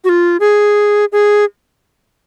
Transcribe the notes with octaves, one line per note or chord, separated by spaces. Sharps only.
F#4
F4
G#4
G#4